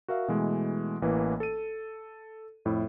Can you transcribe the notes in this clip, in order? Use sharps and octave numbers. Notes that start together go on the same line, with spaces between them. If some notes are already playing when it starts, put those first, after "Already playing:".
F#4 A#4 E5 F5
B2 E3 G#3 A3
A1 E3 A#3 B4
A4 D#7
F2 A2 E4